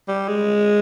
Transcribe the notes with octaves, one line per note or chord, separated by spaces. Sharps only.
G3
G#3